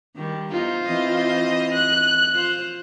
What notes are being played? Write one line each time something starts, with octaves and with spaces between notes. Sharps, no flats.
D#3 G3
E2 D#4 F4 C5
E3 C4 D#5
F#6
F4 C5